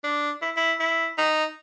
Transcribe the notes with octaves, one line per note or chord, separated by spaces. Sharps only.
D4
E4
E4
E4
D#4